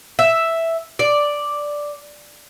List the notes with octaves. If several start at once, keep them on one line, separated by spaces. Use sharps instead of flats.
E5
D5